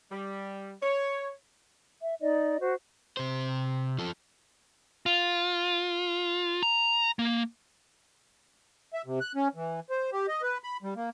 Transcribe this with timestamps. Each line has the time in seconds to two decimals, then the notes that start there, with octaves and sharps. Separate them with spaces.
0.12 G3
0.82 C#5
2.01 E5
2.21 D#4 D5 D#5
2.60 F#4 C5
3.17 C3 C5
3.99 F3 A4
5.06 F4
6.63 A#5
7.19 A#3
8.94 E5
9.06 C3
9.21 F#6
9.35 C#4
9.55 E3
9.90 C5
10.13 G4
10.28 D#5
10.42 B4
10.64 B5
10.83 G3
10.96 A#3